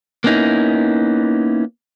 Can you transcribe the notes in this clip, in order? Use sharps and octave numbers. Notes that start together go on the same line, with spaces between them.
A#3 B3 C#4 D#4 E4